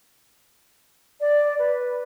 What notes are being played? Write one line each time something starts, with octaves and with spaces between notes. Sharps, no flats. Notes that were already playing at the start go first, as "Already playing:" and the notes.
D5
B4